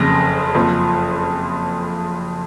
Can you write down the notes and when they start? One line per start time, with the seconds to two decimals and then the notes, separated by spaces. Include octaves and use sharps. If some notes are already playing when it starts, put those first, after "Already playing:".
Already playing: F#1 F2 C#3 A#6
0.54 F#1 F2 F3